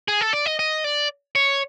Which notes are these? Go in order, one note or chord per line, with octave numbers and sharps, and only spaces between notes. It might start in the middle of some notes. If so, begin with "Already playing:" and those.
G#4
A4
D5
D#5
D#5
D5
C#5